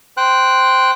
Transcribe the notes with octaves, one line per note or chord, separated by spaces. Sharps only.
C5 G5 F#6